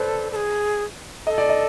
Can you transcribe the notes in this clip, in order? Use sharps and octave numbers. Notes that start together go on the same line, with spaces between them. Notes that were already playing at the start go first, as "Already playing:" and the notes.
Already playing: A4 B4 C5 D5
A4
G#4
A4 D#5
D5
D#5